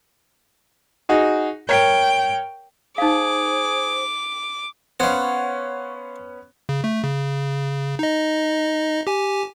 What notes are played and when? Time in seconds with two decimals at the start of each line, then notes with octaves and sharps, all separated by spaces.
1.09 D#4 F#4 G#4
1.69 A#4 C#5 G5
2.98 D#4 G#4 C5 F5 D6
5.00 B3 C#4 C5 C#5 F5 F#5
6.69 C#3
6.84 A3
7.03 C#3
7.99 D#4 D#5
9.07 G4 G#5